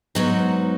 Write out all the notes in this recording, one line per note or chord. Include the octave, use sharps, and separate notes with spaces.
G#2 F#3 B3 D#4 F#4